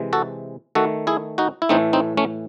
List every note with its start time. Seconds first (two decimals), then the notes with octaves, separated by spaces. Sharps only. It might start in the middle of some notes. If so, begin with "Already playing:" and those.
Already playing: C3 E3 G#3
0.13 F#4 A4
0.75 D#3 A3 F#4 A4
1.07 E4 G#4
1.38 D#4 F#4
1.62 E4
1.69 A2 E3 A3 C4 D#4
1.93 C4 D#4
2.17 A3 C#4